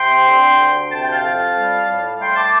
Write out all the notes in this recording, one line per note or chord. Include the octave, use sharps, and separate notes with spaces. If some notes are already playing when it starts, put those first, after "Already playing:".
Already playing: C3 G5 C6
D3
D2
C3 A5
G5
F5 A5
F2
G3
A2
A3 G5 C6
A5 D6